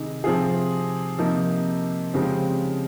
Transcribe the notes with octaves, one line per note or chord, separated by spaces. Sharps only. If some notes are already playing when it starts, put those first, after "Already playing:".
Already playing: C3 D#3 G#3 D#4
C3 F3 C4 F4 G#4
C3 F3 A#3 D#4
C#3 F3 G#3 C4 G4